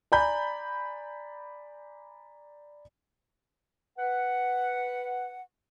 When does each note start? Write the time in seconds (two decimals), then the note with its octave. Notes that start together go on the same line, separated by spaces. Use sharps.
0.12 D5 G#5 A#5 B5 G6
3.99 B4 F#5